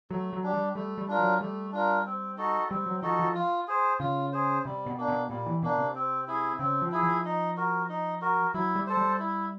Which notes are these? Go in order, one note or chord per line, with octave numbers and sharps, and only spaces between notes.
F#3 A3
F#3
D4 G4
G3
G3 A3
G3
D4 F4 A#4
F#3
G3 A3
D4 F4 A#4
C4
D#4 F#4 A4
G3 C4
F#3
F3 D#4 F#4 A4
F3
F4
G#4 C5
C#3 F4
G#4 C5
C3 G3
B2
A#3 D4
B2
A#2 G3
E3
B2 A#3 D4
C3
C4
E4 G#4
C#3 C4
F3
E4 G#4
F3
D#4
F#4 A#4
D#4
F#4 A#4
F#3 E4
G3
A4 C5
G3
E4